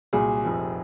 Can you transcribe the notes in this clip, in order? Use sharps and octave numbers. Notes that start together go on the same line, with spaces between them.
C2 A#2 F#3 G#4
F1 F2 C3 F3